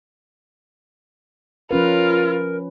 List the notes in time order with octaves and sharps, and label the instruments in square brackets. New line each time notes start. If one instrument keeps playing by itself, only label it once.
[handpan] F3 C#4 B4 [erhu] F4 [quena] A#4